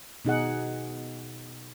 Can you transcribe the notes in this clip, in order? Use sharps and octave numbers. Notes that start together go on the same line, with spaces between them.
B2 D#4 G#4 F#5